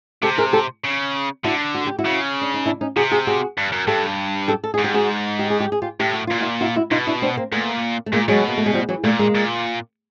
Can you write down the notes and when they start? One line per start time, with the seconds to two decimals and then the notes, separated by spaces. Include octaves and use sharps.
0.23 C3 G4 A4
0.38 G#4 A#4
0.53 G4 A4
0.84 C#3
1.44 D3 E4 F#4
1.75 F#4
1.87 G4
1.98 E4 F#4
2.05 C#3
2.41 D4
2.54 D#4
2.66 D4 E4
2.81 C#4 D#4
2.96 C3 F#4 G#4
3.11 F#4 G#4
3.27 F#4 G#4
3.58 G2
3.72 F#2
3.87 G2 G4 A4
4.48 G4 A4
4.64 A4
4.74 G#2 G#4
4.84 G4
4.94 F#4 G#4
5.39 G4
5.50 G#4
5.60 G4
5.72 G#4
5.82 F4 G4
6.00 A2 G4
6.13 F#4
6.27 A#2 F4
6.40 E4 F#4
6.61 E4 F#4
6.76 E4 F#4
6.91 B2 D#4 F4
7.07 D4 E4
7.22 C4 D4
7.37 A#3 C4
7.52 A#2 A3 B3
8.06 A3
8.13 A#2 G#3 A#3
8.28 B2 F#3 G#3
8.48 A#3
8.58 A3
8.66 G#3
8.73 F3 G3
8.89 E3 F#3
9.03 A#2 G3 A3
9.19 G#3 A#3
9.35 A#2